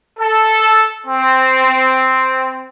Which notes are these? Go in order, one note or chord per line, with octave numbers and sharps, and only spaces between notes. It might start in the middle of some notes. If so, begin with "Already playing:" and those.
A4
C4